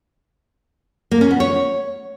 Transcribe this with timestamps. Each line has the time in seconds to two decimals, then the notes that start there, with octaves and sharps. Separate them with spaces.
1.11 A#3
1.21 C#4
1.31 B3
1.40 C#5